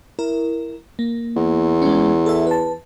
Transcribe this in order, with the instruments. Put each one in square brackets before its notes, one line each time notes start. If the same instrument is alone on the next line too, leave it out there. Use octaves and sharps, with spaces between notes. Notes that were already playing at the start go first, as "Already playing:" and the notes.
[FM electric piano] E4 A#4
A#3
[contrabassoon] E2
[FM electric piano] G#3 C#4
A4 E5
B4 A5